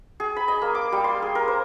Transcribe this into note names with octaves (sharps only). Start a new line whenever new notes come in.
G#4
B5
D#5
A#3
D6
G3
C6
G#4
A#4
C5